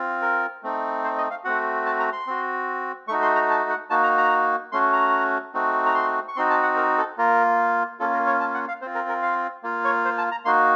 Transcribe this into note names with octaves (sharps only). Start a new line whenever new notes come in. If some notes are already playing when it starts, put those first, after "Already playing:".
Already playing: C4 F4
A#4
A3 C4 D#4
C5
D#5
F5
A3 C4 F#4 F#5
A5
A#5
C6
C4 F#4
A3 D#4 F#4 C#6
C6
A#5
A5
F#5
A#3 D#4 F#4 A5
A#5
A#5
A3 C#4 F#4 C6
A#5
A3 C4 D#4 F#4
A#5
C6
C#6
C4 D#4 F#4 C6
A5
F#5
A#4
A4
A#3 F4 A#4
A#3 C#4 F4 A4
A#4
C#5
A5
F#5
F5
C4 F4 C5
A#4
A#4
F5
A#3 F4
C#5
C5
A5
A#5
A#3 D#4 F#4 C6